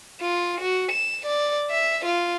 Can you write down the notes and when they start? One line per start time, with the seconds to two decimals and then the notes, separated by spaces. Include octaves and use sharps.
0.21 F4
0.61 F#4
0.92 E7
1.26 D5
1.71 E5
2.05 F4